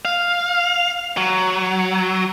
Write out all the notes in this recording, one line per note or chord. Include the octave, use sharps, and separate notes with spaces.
F5
F#3